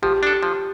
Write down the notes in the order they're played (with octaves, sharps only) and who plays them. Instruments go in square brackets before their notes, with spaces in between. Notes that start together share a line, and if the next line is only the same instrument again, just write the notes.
[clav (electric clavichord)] F3 [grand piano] G4
[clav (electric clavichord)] D4 A4
F3